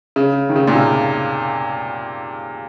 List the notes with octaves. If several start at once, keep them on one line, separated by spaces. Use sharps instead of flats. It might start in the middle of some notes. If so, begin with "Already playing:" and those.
C#3
D#3
C#3
A#2
C3